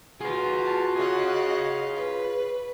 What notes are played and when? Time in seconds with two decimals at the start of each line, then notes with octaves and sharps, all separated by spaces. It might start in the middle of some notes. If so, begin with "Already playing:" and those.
0.21 F4 F#4 G#4 B4
0.63 A5
0.96 G#4 C#5 D#5 F#5
1.95 B4